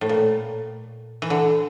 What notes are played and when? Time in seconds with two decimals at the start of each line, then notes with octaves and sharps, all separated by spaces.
0.01 A2
0.09 A#2
1.22 E3
1.30 D3